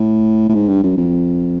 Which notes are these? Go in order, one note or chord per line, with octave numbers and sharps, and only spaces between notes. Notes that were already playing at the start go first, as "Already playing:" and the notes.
Already playing: A2
A2
G#2
G2
F#2
F2